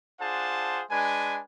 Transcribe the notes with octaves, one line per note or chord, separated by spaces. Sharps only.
D4 F4 G#4 C5 F#5 A5
G#3 D4 B4 G#5